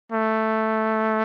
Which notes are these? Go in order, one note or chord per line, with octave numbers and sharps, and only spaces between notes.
A3